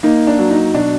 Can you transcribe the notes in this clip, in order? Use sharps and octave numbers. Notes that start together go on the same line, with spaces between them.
A#3 D#4
D4
F#3
D#4
B2 D4